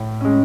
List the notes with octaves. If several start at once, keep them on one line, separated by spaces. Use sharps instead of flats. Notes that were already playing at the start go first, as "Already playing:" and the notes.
Already playing: A2
G#3 C#4